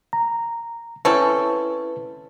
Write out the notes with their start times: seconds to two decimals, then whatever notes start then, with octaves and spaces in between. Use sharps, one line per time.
0.13 A#5
1.05 C4 C#4 E4 A4 B4